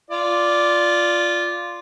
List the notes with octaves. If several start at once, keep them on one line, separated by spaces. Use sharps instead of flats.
F4 D5